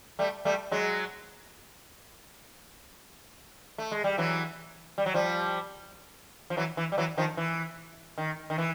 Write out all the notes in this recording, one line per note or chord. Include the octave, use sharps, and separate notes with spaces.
G3 A3
G3 A3
F#3 G#3
A3
G#3
G3
E3 F#3
G3
F#3
F3 G3
F3
E3 F#3
E3
G3
E3 F#3
D#3 F3
E3
D#3
D#3
E3